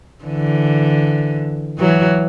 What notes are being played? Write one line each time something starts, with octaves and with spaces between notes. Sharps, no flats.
D3 E3
E3 F#3